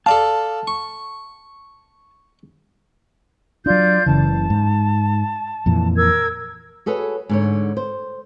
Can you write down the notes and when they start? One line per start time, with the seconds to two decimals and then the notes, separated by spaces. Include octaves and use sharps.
0.06 A4 D5 F5 A5
0.67 C#6
3.66 F#3 D4 F4 D5 G6
4.06 F#1 C#3 E3 A5
4.50 G#2
5.66 F2 A#2 E3
5.96 A#4 E6 G#6
6.86 F#4 G#4 A4 B4 C#5
7.29 G#2 D3 C#5
7.77 C5